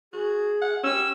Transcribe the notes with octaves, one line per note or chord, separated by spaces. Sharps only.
F#4 G#4
F#5
C#4 G4 E6